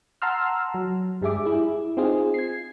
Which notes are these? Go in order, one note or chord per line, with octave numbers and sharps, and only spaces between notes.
F#5 A5 A#5 C6 E6 F6
F#3
G2 G3 G#3 G#4 E5 D6
E4 G#4
C4 D#4 F4 G#4
G#6 C7